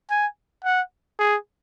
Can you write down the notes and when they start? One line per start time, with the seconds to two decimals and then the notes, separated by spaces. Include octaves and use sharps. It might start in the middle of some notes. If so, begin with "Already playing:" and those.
0.10 G#5
0.65 F#5
1.19 G#4